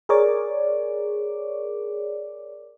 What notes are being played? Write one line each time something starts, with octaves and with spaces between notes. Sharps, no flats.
G#4 A#4 C#5 D5 D6